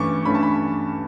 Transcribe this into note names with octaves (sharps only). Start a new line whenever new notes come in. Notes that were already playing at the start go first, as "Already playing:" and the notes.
Already playing: G2 E3 A3 C#4 C#6 D6
G2 E3 A3 C#4 B5
A5
B5